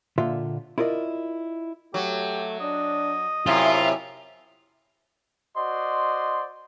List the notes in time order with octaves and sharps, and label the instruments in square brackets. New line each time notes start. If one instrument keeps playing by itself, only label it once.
[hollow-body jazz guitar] A#2 D3 F4 E5 C6
E4 F4 A#4 D5 D#5
[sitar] F#3 [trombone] A3 [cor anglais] G4
[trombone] D4 [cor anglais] D#5
[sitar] F#2 C3 [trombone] E4 [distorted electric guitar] F4
[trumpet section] F#4 C5 D5 D#5 C6